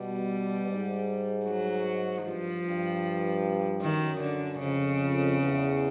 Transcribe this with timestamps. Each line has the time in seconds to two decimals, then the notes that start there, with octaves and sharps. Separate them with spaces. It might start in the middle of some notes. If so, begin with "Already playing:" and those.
Already playing: B2 G3
0.67 G#2
1.45 F#3
2.24 G2 F3
2.63 G2
3.81 F#2 D#3
4.21 D3
4.60 F2 C#3
5.39 E2